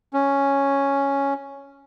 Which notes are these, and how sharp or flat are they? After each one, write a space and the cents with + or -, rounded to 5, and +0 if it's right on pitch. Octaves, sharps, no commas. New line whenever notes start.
C#4 +0